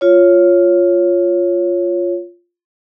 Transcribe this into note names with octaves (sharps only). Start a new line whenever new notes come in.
F4 C#5